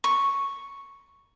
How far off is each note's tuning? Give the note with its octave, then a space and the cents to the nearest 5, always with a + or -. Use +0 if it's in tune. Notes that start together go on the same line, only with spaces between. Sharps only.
C#6 +0